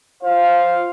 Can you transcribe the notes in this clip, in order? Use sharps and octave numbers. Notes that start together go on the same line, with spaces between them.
F4 C5 F5